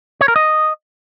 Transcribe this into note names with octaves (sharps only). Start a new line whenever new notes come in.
C#5
A#4
D#5